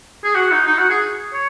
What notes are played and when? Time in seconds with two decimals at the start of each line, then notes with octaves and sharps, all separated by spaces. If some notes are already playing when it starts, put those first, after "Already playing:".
0.24 G#4
0.35 F#4
0.52 D#4
0.67 D#4
0.79 F#4
0.90 G#4
1.34 C#5